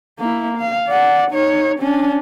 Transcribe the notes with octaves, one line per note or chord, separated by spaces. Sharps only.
A#3 E4
F5
D5 F#5
D#4 C#5
C#4 D4